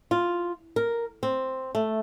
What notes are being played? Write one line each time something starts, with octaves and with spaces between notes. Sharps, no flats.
F4
A#4
C4
A3